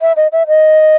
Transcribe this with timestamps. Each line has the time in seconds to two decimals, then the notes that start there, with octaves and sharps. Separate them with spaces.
0.01 E5
0.16 D#5
0.32 E5
0.48 D#5